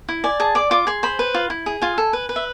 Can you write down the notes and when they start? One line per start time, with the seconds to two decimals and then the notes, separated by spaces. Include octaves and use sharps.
0.09 E4
0.24 D5 G#5
0.40 G#4 A5
0.55 D5 D6
0.71 F4 D6
0.87 G#4 C6
1.03 C5 B5
1.19 B4
1.34 F4
1.50 E4
1.66 G#4
1.82 F4 G#5
1.98 A4
2.13 B4
2.29 B4
2.36 E5